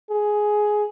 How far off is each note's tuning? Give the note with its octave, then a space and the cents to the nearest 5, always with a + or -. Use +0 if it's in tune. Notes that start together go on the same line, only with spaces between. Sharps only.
G#4 +10